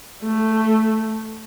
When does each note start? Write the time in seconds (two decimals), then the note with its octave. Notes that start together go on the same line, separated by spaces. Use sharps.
0.23 A3